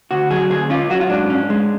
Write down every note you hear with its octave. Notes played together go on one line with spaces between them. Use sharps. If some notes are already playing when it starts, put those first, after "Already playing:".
D2 F#4
F#3 G#4
D2 G#4
C#4 F4
F#3 F#4
F4
G#2 D4
C#4
G#3